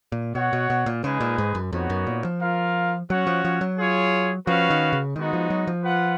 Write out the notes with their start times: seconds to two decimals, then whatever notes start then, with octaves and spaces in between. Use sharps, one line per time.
0.12 A#2
0.35 B2 F#4 C#5 F#5
0.53 B2
0.70 B2
0.86 A#2
1.04 C#3 G#3 D#4 G#4 B4
1.21 A#2
1.38 G#2
1.55 F#2
1.73 F2 B3 D#4 F#4 C#5
1.90 F#2
2.07 A#2
2.25 F3
2.41 F4 A#4 F5
3.10 F#3 C#4 F#4 C#5 F#5
3.27 F3
3.45 F3
3.61 F#3
3.78 F4 G#4 C#5
4.47 F3 C#4 F#4 B4 F5
4.70 D#3
4.93 C#3
5.16 D#3 G#3 B3 D#4 F#4
5.33 F3
5.50 F#3
5.67 F3
5.84 F4 B4 F#5